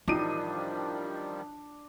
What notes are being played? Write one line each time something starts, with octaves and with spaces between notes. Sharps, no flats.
A1 D#3 F3 G3 D4 D#4 F4 D#7